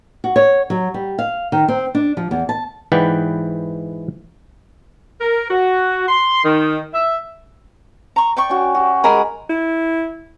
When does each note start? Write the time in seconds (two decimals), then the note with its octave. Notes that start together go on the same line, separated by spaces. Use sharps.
0.24 F#4
0.36 C#5
0.70 F#3
0.94 G3
1.19 F5
1.52 D#3
1.68 C4
1.95 D4
2.17 F3
2.31 E2
2.49 A5
2.92 G#2 E3 B4 D5 F#5 G5
5.21 A#4
5.50 F#4
6.07 C6
6.43 D#3
6.92 E5
8.16 A#5 C#6
8.37 D5 G5 C#6
8.50 C#4 F#4
8.75 F#4 G4
9.04 G#3 G#4 A#4 B5
9.49 E4